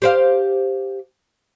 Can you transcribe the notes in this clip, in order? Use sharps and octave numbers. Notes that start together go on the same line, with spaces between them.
G4 C5 F5